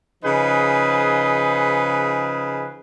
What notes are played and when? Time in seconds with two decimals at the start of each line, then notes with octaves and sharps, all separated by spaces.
0.24 C#3 F3 D#4 G#4 B4